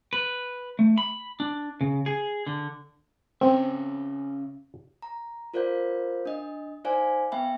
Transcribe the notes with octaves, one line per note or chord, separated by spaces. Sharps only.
B4
A3
B5
D4
C#3
G#4
D3
C#3 C4 C#4 E5
A#5
F4 A#4 C5 D5 F5 G6
D4 D#5
D#4 C5 D5 F5 G#5
B3 E5 G5 B5